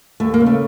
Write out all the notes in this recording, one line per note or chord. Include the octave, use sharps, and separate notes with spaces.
D#2 A3
A#3
C#3
A3